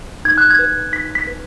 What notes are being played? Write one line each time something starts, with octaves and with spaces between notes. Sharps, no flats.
D#4 G#6
F#6
G#6
B4
D#4 B6
B6
B4